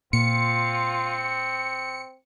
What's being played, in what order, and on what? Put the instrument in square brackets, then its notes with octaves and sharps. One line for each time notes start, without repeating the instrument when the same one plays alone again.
[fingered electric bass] A#2 [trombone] C4 [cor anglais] F4 [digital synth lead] C#7